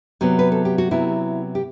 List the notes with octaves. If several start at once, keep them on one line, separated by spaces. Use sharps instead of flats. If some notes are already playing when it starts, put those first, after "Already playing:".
C3 F#3 B3
B4
A4
G4
F#4
C3 F#3 B3 E4
G4